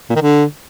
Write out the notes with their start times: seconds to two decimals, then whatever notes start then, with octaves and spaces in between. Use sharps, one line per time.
0.10 A#2
0.16 D#3
0.22 D3